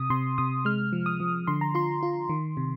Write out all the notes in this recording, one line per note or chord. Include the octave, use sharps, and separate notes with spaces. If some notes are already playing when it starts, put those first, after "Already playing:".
Already playing: C3 D#6
C3 C6
C3 D#6
G#3 F6
F3
D#6
F3
D3 C6
A#5
F4 C6
F4
D#3
C3